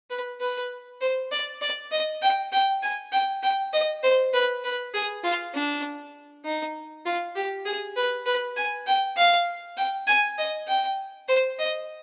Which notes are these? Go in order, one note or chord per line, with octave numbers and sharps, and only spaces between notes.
B4
B4
C5
D5
D5
D#5
G5
G5
G#5
G5
G5
D#5
C5
B4
B4
G#4
F4
D4
D#4
F4
G4
G#4
B4
B4
G#5
G5
F5
G5
G#5
D#5
G5
C5
D#5